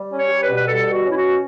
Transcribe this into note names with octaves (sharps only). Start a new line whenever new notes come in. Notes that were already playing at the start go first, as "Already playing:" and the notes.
Already playing: G3
C#4
C#5
G3
B4
B2
B4
G3 A4
B2
F#4
C#4
E4
F#4
B2